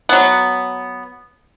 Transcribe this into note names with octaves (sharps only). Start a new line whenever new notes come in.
F#3 B3